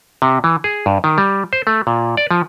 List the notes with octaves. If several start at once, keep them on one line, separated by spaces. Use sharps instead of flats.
C3
E3
G#4
G2
D#3
G3
C5
A3
A#2
D5
F3